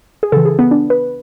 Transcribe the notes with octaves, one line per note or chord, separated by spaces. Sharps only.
G#4
C#3 E3 A4
G#4
B3
D4
B4